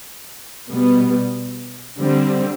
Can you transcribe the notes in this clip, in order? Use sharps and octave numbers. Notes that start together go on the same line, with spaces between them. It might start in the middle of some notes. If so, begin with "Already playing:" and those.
B2 G3 B3
D3 G3 C4